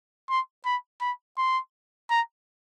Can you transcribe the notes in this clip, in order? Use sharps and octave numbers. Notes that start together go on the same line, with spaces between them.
C6
B5
B5
C6
A#5